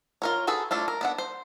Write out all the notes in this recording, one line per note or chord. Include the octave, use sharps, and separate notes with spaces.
F4 A#4 C#5
F#4 G#4 A4 B4
A3 D4 E4 F4
A#4
B3 D4 F#5
C5